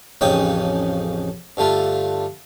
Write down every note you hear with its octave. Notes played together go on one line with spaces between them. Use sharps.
A1 F2 C#3 D#4 G5 D#6
G2 D3 A3 F4